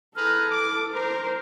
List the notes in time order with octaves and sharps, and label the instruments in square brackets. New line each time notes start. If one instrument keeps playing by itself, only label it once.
[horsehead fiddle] E4 A4 [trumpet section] G#4 B4 A#5 [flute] F6
[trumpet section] D6
[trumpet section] A#4 [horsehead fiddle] C5 [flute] A#5